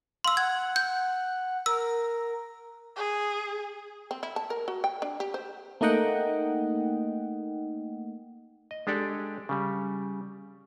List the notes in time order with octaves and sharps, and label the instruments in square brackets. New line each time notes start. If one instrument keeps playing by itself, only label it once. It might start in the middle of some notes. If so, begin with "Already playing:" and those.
[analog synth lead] F5 [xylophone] C6 E6
[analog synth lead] F#5 [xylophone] G#6
[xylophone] G6
[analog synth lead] A#4 [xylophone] E6
[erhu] G#4
[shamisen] C4
E4
A5
A#4
F#4
G5
D4
G4
C5
[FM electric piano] A3 A#3 D#4 D#5 F#5 G5
[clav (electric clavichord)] D#5
G#3 D4 G4 A4 D5 G5
C#3 G3